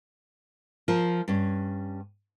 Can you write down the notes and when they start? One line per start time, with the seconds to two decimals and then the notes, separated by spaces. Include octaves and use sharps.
0.88 F3 F4 A#4
1.28 G2 C#4